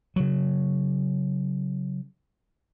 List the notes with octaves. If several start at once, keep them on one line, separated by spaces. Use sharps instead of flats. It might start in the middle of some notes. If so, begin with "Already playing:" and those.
C#3 F#3